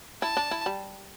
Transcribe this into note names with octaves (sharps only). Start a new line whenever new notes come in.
E4 A5
D4
E4
G3